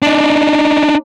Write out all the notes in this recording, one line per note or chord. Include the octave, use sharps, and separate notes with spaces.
D4 D#4